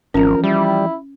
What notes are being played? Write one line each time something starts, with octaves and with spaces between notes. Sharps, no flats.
G#1 E2 F3 C#4 A#4
G3 E4